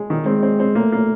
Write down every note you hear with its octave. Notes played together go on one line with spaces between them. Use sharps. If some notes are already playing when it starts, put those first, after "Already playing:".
Already playing: G#3
D#3
G#3 C4
C4
C4
A3 A#3
A#3